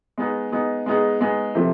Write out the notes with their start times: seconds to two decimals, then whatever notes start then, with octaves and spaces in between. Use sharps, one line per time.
0.18 G#3 B3 D#4 G#4
0.52 G#3 B3 D#4 G#4
0.86 G#3 B3 D#4 G#4
1.21 G#3 B3 D#4 G#4
1.55 C3 F3 A3